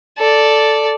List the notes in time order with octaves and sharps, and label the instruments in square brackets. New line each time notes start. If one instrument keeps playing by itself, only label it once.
[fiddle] A4 D5